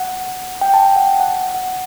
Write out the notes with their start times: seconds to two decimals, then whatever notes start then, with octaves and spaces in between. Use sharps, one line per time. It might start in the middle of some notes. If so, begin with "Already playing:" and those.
Already playing: F#5
0.61 G5
0.74 A5
0.85 G5
0.96 F#5
1.20 F#5
1.31 F#5
1.43 F#5
1.54 F#5